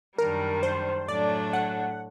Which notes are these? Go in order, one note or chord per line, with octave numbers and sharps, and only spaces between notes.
F#2 D#3 G3 D4 A#4
C5
A2 F#3 A3 D4 D5
F#5